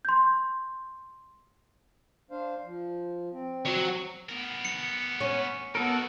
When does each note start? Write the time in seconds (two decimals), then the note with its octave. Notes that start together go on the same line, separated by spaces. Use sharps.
0.05 C6 G6
2.31 D4 C5 F5
2.65 F3
3.33 C4
3.65 F#3 C#5
4.29 B3 A#4
4.65 C#7
5.21 C#4
5.75 B3 D#4 F#4 A4 A#4